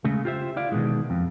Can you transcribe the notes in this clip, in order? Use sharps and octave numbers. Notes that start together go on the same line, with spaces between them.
C#3 G#3 A3
F4 G4 C5 E5
E4 D5 F5
B2 D#3 E3 G#3
F2